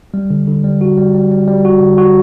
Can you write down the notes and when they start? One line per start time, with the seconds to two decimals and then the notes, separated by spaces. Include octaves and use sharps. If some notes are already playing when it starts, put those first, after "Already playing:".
0.14 G3
0.30 D3
0.47 D3
0.64 G3
0.81 F#4
0.97 G3
1.15 G3
1.31 G3
1.48 G3
1.65 F#4
1.81 D3
1.98 F#4